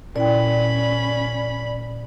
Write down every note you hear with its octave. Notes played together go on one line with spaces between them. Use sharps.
A#2 C#4 E4 D5 G5 B5